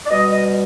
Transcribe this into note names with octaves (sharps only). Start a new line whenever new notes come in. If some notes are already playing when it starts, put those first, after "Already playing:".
D5
B2 G3 D#5
D#5